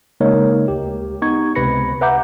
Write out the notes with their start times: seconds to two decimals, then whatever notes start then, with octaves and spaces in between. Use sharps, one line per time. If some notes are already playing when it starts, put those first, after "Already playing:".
0.20 C#3 G#3 A#3 D#4 A#4 C#5
0.68 D2 G4
1.22 B3 D#4 C#6 G#6
1.55 C#2 C3 B4 B5 A#6 C#7
2.01 B4 E5 F#5 A#5 D6 G6